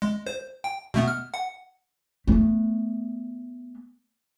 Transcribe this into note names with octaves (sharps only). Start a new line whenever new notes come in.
G#3
C5
G5
B2 A3 B3
F6
F#5
A3 B3